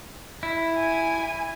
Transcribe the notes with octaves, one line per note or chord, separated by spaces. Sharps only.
E4
G#5